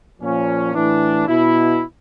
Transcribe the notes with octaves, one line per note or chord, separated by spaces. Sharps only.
A#2 F3 C#4
A2 E3 D4
B2 E4